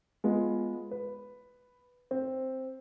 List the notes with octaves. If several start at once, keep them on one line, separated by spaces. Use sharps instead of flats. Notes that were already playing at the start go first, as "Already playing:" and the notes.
G#3 B3 F4
B4
C4